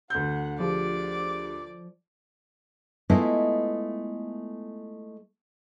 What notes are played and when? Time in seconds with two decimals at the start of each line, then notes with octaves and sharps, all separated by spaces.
0.10 D2 F#5 G6
0.60 F3 G4 G#4 D5 D6
3.10 G#3 A3 B3 E4 F4 D#5